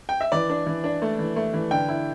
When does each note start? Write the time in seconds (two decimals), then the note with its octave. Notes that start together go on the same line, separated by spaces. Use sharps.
0.09 G5
0.21 E5
0.32 E3 D5
0.49 D4
0.67 E3
0.84 D4
1.02 A3
1.19 E3
1.36 A3
1.54 E3
1.71 D3 G5
1.89 E4